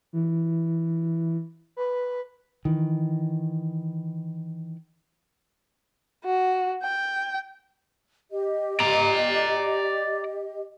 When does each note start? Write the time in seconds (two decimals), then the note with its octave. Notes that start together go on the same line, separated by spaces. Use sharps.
0.13 E3
1.77 B4
2.65 D#3 E3
6.25 F#4
6.83 G5
8.31 G4 D#5
8.80 D5 A#5